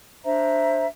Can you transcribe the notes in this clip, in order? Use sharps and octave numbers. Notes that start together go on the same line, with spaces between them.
D4 C5 E5 A#5